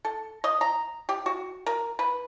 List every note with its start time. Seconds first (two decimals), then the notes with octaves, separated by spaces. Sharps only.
0.05 A4
0.44 D#5
0.61 A#5
1.09 G4
1.26 F#4
1.66 A#4
1.99 B4